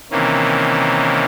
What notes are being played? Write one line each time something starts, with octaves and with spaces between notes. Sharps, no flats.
C3 D#3 E3 A#3 C#4